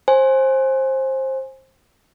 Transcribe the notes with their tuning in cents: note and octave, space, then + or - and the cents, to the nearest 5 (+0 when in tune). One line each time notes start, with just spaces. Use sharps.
C5 +20 G#5 +0